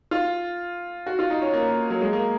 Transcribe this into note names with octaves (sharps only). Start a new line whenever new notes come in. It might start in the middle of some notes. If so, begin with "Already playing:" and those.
F4
F#4
F4
D#4
C#4
A#3
F#3
G#3
A#3